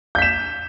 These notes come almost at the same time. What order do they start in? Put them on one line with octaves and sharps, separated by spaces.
G6 B6 E7